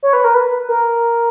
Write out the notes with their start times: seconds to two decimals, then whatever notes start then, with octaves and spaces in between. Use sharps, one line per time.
0.03 C#5
0.13 B4
0.24 A#4
0.35 B4
0.69 A#4